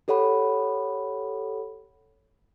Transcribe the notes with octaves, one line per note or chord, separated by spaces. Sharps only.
G4 A4 C#5 F#5 B5